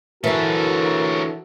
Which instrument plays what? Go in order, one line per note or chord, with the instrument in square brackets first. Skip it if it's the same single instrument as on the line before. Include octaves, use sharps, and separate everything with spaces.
[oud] D3 E3 [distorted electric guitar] C#4 A4 [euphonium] F#4 [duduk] A#4